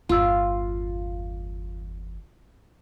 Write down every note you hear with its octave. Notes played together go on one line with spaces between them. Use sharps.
G1 E2 F4 F5 E6